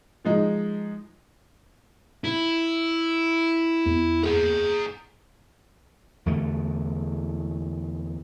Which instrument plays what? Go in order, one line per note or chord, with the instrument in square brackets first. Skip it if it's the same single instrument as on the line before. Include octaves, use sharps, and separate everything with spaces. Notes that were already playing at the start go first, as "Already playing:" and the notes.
[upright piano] F3 G#3 D#4
[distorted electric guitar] E4
[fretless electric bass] E2 B3
[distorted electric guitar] G#4 F#5
[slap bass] E2 D3 A3